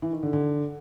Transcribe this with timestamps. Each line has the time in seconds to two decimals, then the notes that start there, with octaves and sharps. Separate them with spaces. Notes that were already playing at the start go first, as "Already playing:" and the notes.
0.02 E3
0.12 D#3
0.23 D3
0.33 D3